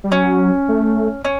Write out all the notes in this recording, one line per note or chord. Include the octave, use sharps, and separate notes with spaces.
G3
F#3 C#4
A3
C#4